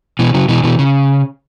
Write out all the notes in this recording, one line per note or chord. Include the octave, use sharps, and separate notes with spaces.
B2 E3
C#3 F#3
B2 E3
B2 E3
C#3